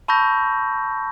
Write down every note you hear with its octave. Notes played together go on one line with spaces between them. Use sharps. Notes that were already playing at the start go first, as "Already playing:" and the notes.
A5 B5 C#6 E6 G6 A#6